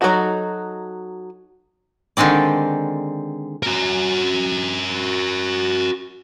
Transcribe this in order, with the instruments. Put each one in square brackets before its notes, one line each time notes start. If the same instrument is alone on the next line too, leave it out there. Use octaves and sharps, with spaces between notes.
[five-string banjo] F#3 G#3 D#4 F#4 A4
[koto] D3 D#3 G#3 C4 D5
[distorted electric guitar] F#4 A#4